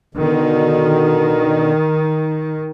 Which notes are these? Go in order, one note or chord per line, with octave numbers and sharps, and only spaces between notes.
B2 D3 D#3